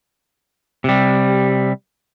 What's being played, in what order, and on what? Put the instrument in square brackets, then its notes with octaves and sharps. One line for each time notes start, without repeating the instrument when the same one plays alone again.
[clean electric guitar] C3 G3